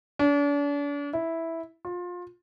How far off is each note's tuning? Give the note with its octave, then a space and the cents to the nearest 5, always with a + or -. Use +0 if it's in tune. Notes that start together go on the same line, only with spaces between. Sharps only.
D4 -40
E4 -5
F4 +25